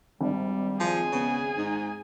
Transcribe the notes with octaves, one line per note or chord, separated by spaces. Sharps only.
G#1 G3 D4
F3 G#4 G#5
C#3 B3
G#2 D#4